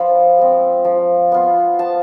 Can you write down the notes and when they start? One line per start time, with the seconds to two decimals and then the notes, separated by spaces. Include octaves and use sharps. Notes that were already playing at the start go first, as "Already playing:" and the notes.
Already playing: F3 B3 D4 F4 A5 B5
0.38 G#3 C4
0.85 F3
1.32 B3 F4
1.79 F3 A5